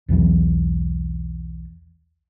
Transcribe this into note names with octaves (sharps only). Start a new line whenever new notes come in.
B1 E2 E3 F#3